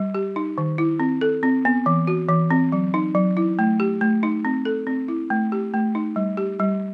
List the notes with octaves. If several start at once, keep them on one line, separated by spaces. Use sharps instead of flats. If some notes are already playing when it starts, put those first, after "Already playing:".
Already playing: G3
G4
D#4
D#3
E4
C4
A4
C4
B3
E3
F#4
E3
C4
F#3
D#4
F#3
E4
A3
G4
A3
D#4
C4
A4
C4
E4
A3
G4
A3
D#4
G3
G4
G3